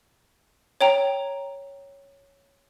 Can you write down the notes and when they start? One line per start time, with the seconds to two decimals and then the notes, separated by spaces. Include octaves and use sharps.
0.81 C#5 G5 A#5